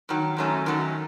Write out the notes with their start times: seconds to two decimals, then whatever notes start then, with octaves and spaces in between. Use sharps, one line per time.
0.09 G2 D#3 F#3
0.37 F#2 D#3 F#3 A3 C#4
0.66 F#2 D#3 F#3 A3 C#4